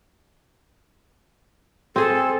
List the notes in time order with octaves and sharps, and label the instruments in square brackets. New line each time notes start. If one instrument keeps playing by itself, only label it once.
[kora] C4 G#4 [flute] A4